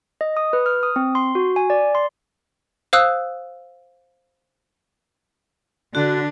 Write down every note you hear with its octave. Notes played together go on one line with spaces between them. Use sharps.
D#5
D#6
B4
F6
D#6
C4
C6
F#4
G#5
D5
C6
C5 F5 D#6 E6 F#6
D3 D4 F#4